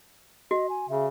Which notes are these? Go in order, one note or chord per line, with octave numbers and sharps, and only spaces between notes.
F#4 D#5
G#5
C#3 E5